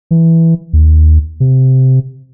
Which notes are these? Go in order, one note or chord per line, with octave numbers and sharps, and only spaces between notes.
E3
D#2
C3